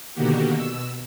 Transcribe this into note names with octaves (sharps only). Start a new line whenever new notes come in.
B2 D3 D#3 A#3 F#4 G4
B2 E6